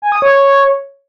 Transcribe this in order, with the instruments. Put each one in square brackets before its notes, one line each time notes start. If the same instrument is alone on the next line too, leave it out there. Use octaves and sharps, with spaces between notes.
[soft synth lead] G#5
D#6
C#5
C#5